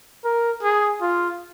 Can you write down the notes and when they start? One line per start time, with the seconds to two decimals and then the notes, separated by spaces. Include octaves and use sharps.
0.25 A#4
0.63 G#4
1.01 F4